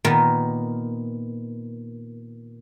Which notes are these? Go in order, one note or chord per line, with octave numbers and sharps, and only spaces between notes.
A#2 D#3 B3 A#4